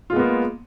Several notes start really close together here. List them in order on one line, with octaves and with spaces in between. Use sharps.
F4 G#3 B3 A#3